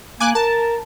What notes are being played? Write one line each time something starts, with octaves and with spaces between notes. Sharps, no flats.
A#3 G#5 D6 F#6
A#4 A5